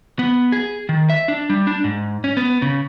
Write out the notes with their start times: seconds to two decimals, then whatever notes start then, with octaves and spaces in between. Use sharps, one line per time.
0.19 B3
0.52 G#4
0.89 D#3
1.09 E5
1.28 D4
1.50 G3
1.67 D4
1.84 G#2
2.24 C#4
2.37 B3
2.62 C#3